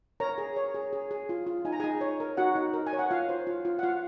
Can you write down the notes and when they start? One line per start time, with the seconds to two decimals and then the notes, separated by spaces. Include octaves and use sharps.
0.20 A#4 C#5 A#5
0.38 G#4
0.57 C#5
0.74 G#4
0.93 G#4
1.11 G#4
1.29 F4
1.47 F4
1.65 D#4 G#5
1.72 A#5
1.80 D#4 G#4 G#5
2.01 C#5
2.20 A#4
2.37 D#4 F#4 F#5
2.55 D#4
2.74 A#4
2.87 G#5
2.93 C#5
2.99 F#5
3.11 F4 F5
3.29 C5
3.47 F4
3.65 F4
3.79 F#5
3.83 F4 F5